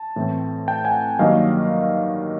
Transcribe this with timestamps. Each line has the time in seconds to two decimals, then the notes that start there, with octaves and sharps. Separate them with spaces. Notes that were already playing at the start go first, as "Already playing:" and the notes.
Already playing: A5
0.16 A2 E3 A3 C4
0.68 G5 A5
0.85 F#5 G#5
1.19 G2 D#3 F#3 A#3 D#5 F5